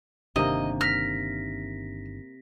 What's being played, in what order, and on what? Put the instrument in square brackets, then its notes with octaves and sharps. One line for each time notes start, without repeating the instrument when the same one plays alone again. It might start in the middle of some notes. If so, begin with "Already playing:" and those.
[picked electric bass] G1 D#3 D4 [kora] C3 A#3 [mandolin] D#5
[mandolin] F6 [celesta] A#6 B6